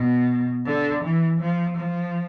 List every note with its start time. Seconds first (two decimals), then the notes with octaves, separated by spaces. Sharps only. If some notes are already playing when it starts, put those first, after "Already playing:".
Already playing: B2
0.65 D3
1.03 E3
1.40 F3
1.78 F3